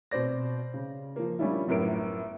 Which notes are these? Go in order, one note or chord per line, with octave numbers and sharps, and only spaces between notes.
B2 C4 C5 D5 A#6
C#3
F3 A#3
G3 C#4 D4 E4 F4
G1 F#2 A2 A#4 D7